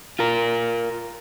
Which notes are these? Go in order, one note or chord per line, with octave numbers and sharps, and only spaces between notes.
F4 A#4